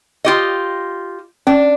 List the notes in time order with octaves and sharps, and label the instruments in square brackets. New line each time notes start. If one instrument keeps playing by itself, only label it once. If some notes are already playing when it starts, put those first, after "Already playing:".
[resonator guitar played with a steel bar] F4 G4 D#5
[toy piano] C#4 [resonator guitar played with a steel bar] D4